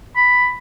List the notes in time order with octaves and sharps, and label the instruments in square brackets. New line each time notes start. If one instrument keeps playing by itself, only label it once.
[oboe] B5